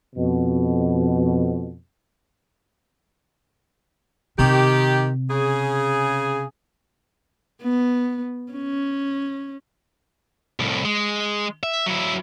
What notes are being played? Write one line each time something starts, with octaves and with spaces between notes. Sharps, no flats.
F2 B2
C3 D#3 G4
C#3 G#4
B3
C#4
C2 A2
G#3
E5
F#3 E4